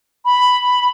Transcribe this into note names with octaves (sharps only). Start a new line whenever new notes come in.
B5